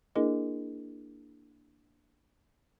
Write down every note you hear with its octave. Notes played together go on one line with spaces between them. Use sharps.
A#3 D4 E4 G#4 A#4 D#5